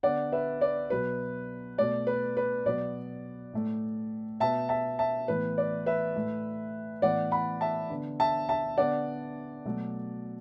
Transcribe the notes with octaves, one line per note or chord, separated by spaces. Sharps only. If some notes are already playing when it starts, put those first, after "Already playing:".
D3 B3 D5 F#5
B4 E5
D5
B2 F#3 B3 B4
B2 A3 D5
B4
B4
B2 F#3 B3 D5
A2 A3
B2 B3 E5 A5
E5 A5
E5 A5
A2 E3 B3 B4
D5
B4 E5
A2 A3
A2 E3 B3 D5 F#5
F#5 B5
E5 A5
D3 B3
E5 A5
E5 A5
D3 B3 D5 F#5
B2 F#3 A3